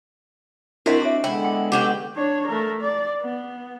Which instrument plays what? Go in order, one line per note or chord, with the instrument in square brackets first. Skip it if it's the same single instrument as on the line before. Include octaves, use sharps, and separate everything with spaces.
[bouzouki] C4 F#4 [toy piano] D4 D#5 [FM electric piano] E4 A#4 B6
[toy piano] E4 E5 [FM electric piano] D6
[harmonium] D3 G#3 B3 [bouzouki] E4 [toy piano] G5
[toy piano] G5
[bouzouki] F#3 F#4 G4
[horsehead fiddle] D4 C#5
A3 A#4
D5
B3